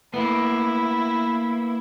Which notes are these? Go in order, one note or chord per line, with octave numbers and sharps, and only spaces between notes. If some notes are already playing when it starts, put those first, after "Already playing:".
A#3 B3 E4